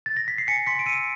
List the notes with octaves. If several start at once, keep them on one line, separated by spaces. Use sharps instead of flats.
A6
A#6
B6
C7
G#5 B6 C#7
C6 B6 C#7
D7
E6 C#7 D#7